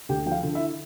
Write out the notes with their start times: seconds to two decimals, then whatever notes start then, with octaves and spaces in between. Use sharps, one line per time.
0.09 D2 G4 G5
0.26 F3 G5
0.32 F4 F5
0.43 D3
0.54 E4 E5